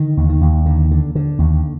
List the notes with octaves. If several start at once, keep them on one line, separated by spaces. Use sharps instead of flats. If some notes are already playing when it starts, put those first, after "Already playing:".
Already playing: D3 D#3
D#2
D#3
D#2
D3
D3
D3
D#2